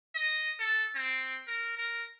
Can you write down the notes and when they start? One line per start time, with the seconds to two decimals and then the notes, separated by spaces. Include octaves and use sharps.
0.15 D#5
0.60 A4
0.95 C4
1.48 A#4
1.77 A#4